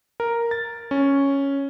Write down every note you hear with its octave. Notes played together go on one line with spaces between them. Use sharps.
A#4
A6
C#4